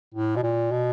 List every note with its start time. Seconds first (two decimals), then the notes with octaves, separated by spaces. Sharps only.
0.14 A2
0.36 B2
0.43 A#2
0.72 B2